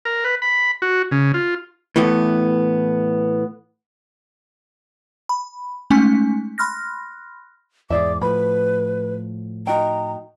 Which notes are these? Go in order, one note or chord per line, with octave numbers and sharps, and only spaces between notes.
A#4
B4
B5
F#4
C#3
F4
A2 E3 A3 B3
B5
G#3 A3 C#4 D#4 G#5
B5 C6 F6 F#6 A#6
E2 G#2 G#4 D5 E5 D6
A2 F3 B4 B5
D#4 F#4 G5 A#5